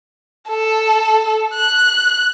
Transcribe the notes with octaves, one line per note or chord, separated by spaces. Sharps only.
A4
F#6